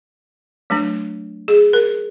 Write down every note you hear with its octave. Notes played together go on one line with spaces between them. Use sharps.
F#3 A3 D4
G#4
A#4